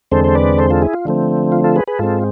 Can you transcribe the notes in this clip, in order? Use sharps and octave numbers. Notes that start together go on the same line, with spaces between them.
E2 D3 G#3 C4 A4 C5
C5
B4 D5
A4 C5
F4 A4
E4 G#4
F4
D3 F3 A3 C4
F4
F4 A4
G#4 B4
G#4 B4
G#2 G#3 C4 F4 A4